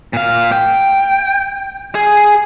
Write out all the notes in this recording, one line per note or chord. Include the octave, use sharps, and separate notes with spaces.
A#2 F5
G5
G#4